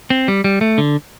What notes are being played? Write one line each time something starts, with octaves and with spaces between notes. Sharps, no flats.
C4
G3
G3
A3
D3